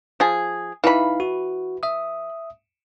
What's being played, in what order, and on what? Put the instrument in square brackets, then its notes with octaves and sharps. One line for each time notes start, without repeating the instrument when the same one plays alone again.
[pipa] F3 G#4
[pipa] E3 B5 [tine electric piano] D#4 E4 F5
[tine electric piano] F#4
E5 D#6